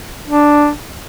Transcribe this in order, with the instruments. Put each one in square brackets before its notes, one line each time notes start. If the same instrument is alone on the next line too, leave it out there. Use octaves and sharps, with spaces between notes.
[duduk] D4